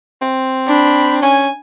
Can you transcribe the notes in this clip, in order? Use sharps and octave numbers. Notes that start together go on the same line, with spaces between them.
C4
D4 B5
C#4 G#5